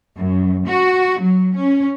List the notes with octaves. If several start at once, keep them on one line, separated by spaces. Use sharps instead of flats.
F#2
F#4
F#3
C#4